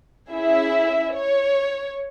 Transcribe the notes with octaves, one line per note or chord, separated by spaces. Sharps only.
C#4 E4 G#4 E5
C#5